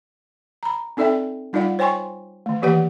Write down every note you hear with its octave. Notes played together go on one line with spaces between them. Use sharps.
A#5 B5
C4 D#4 A4 D5 E5 G5
G3 D#4 F4 D5 F5 F#5
C5 C#5 G5 G#5 C6 C#6
D#3 A3
E3 A#3 G4 B4 D5 F#5